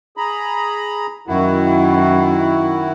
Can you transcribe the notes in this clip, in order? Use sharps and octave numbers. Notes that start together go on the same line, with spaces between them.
G#4 A#5 B5
F#2 D#3 E4 F#4